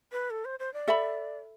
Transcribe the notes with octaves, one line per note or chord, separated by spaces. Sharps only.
B4
A4
C5
C5
D5
A4 E5 B5